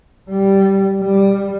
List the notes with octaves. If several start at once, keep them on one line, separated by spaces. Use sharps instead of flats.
G3
G3